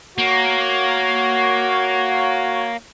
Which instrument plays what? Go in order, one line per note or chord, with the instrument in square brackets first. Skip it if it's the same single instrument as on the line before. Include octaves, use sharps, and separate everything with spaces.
[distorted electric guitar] A#3 [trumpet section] F#4 C#5